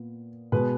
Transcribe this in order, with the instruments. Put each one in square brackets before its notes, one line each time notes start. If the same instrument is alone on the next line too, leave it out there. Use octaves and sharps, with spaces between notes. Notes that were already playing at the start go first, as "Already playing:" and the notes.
Already playing: [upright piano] A#2 B3
B2 G#3 B3 B4